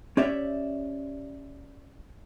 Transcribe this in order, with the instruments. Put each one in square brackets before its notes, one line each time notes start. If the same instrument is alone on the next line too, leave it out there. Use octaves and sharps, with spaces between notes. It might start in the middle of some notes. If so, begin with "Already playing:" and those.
[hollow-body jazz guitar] C#4 G4 C#5 D5 E5